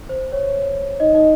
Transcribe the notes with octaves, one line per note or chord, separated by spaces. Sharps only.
C5
C#5
D#4 D#5
D#4 D#5